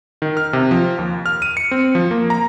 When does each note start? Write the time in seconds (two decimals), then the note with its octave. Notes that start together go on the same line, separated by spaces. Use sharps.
0.22 D#3
0.37 F6
0.53 C3
0.71 F3
0.98 D#2
1.26 F6
1.42 D#7
1.57 C#7
1.71 C4
1.95 F3
2.11 A#3
2.30 A#5